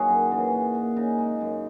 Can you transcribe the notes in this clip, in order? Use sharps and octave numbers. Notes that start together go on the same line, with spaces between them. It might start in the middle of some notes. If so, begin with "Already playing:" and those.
Already playing: D#3 F#3 A#3 F#4 G#4
F#2
C#3 E3 A#3
A#2
A#3
C#3 D#4
G#3
F#2